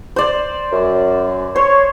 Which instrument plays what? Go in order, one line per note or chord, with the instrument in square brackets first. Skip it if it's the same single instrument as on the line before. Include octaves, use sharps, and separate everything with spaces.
[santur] C5 D5
[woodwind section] F#2
[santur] C5 [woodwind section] C#5